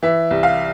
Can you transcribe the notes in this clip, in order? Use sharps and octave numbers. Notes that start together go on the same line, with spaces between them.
E3 E5
C2
F5